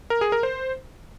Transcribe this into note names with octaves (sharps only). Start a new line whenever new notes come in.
A#4
G#4
A#4
C5